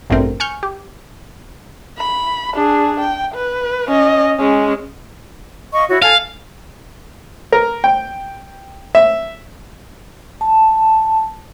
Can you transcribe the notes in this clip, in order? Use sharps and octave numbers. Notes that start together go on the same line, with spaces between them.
A1 G2 B2 A3 C4 A#4
G#5 C#6 F6 G6
G4
B5
D4 G#4
G5
B4
C#4 D#5
G#3 C#4
D#5 F5 C#6
E4 F#4 C#5
A4 F5 G#5 A5
A#4
G5
E5
A5